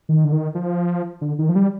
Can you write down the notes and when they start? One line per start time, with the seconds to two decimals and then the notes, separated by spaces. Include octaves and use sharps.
0.09 D#3
0.25 D3
0.32 D#3
0.55 F3
1.21 D3
1.39 D#3
1.49 F3
1.55 G3